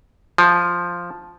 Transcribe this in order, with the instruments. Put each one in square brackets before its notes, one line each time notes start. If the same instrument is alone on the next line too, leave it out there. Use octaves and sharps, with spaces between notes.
[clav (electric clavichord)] F3